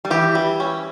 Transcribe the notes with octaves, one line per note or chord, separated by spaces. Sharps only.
G3
E3 G4
G3
C#4